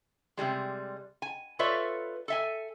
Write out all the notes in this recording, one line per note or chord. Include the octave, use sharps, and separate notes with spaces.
C3 D#3 G3 G#3
G#5
F4 A4 B4 C#5 D5 E5
A4 E5 G#5